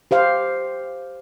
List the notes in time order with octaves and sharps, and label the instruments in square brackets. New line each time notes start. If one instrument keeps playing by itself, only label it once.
[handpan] G4 C5 F5